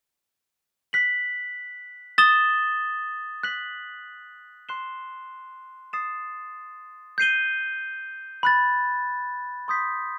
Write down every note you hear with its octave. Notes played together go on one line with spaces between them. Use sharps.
F#6 B6 F#7
D#6 A6 E7 G7
F#6 B6 F#7
C6 F#6 C7 E7 G7
D#6 A6 C7 E7
G6 C7 D#7 G7
B5 F#6 A6
C6 D#6 G6 B6